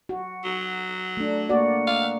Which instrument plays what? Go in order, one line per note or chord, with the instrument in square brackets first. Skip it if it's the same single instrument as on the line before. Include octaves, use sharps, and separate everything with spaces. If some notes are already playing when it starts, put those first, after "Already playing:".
[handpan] F#4
[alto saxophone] F#3
[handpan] A3 D4
A#3 F#4 D5
[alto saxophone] F5